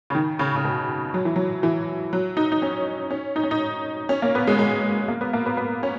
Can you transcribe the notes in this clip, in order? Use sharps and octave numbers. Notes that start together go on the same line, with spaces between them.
C#3
D#3
C#3
C#3
B2
F#3
E3
F#3
E3
F#3
D#4
D#4
C#4
C#4
D#4
C#4
D#4
C#4
A#3
B3
G#3
G#3
A#3
B3
A#3
B3
B3
C#4